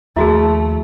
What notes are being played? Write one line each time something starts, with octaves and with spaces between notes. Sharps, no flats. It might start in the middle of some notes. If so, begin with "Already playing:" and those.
D#2 F3 A3 E4 F#4 G#4 E5 A5